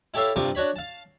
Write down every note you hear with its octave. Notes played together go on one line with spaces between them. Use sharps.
E4 G4 A4 C#5 E5 F5
G2 C3 F4 C#6 D6
D4 F#4 C#5 B5
F5 A5